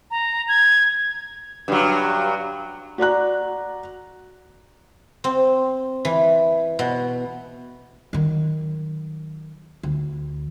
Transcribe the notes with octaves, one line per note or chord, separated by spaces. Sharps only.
A#5
G#6
G2 F#3
F#4 D5 A#5 F#6
C4
E3
B2
D#3 F#3
D2